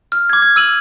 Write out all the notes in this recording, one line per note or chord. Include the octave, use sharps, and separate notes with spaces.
F6
D6 G#6
G#6
E6 D#7 F#7